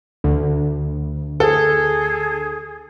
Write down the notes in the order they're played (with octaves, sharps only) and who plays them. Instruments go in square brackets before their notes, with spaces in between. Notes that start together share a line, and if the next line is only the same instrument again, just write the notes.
[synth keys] D2 [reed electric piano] D3
[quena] G#4 [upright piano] A4